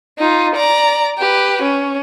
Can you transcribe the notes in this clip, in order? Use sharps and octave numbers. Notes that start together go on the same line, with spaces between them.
D#4 F4
D5 A#5
G4 B4
C#4